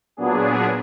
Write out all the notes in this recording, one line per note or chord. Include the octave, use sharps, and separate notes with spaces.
A#2 F#3 B3 D4 G#4